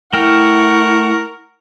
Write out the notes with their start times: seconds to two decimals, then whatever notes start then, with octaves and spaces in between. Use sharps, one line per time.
0.13 A3 E4 A#4 F#5 G5 C#6 F6